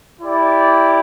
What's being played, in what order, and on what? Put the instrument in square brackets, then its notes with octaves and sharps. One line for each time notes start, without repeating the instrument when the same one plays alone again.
[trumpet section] E4 G4 D5